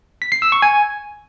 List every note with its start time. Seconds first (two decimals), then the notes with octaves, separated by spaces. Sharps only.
0.22 B6
0.32 C7
0.42 E6
0.52 C#6
0.62 G#5